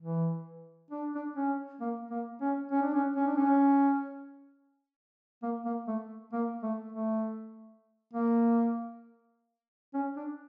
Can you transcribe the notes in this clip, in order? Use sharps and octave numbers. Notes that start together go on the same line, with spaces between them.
E3
D4
D4
C#4
A#3
A#3
C#4
C#4
D4
C#4
C#4
D4
C#4
A#3
A#3
A3
A#3
A3
A3
A#3
C#4
D4